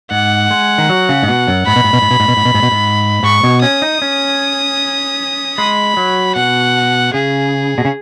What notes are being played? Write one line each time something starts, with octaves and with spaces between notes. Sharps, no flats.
G#2 F#5
G#3
D#3
F#3
C#3
G#2
B2
F#2
G#2 B5
B2
G#2
B2
G#2
B2
G#2
B2
G#2
B2
G#2
B2
G#2
G#2 C#6
B2
C#4 D#6
D#4
C#4
G#3 B5
F#3
B2 F#5
C#3 G#4
B2
C#3